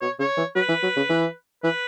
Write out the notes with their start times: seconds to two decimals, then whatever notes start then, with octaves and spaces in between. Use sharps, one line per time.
0.01 B2 C#5
0.19 C#3 C#5
0.37 E3
0.55 F#3 B4
0.69 E3
0.83 F#3
0.96 C#3
1.09 E3
1.64 E3 B4